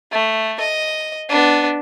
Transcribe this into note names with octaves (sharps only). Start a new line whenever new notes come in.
A3
D#5
B3 D4